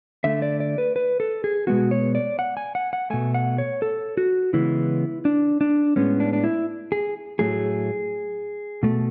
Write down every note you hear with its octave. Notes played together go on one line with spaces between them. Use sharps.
D3 A3 E5
D5
D5
B4
B4
A4
G#4
B2 G#3 B3 F#4
C#5
D5
F#5
G#5
F#5
F#5
B2 A3 G#5
F#5
C#5
A4
F#4
C#3 E3 G#3 B3 E4
D4
D4
A2 G#3 B3 C#4
D4
D4
E4
G#4
A2 F#3 A3 G#4
B2 A3